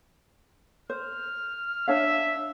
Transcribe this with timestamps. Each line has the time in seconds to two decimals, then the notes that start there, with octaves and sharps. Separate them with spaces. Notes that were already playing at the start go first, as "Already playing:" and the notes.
0.90 C5 F6
1.88 D4 C#5 E5 F5